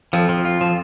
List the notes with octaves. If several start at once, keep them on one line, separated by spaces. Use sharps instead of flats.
F2 F3
F3
F4
F3